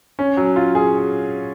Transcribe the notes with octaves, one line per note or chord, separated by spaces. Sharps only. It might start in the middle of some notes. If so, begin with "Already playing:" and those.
C#4
F#3
F4
G#4